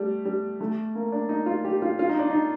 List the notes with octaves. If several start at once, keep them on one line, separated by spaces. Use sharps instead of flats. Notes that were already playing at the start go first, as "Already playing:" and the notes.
Already playing: G3 A3
G3
A3
A#3
D4
D#4
F4
G4
F4
F4
D#4
D4
D#4